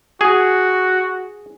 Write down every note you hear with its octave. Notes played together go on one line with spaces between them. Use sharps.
F#4 G#4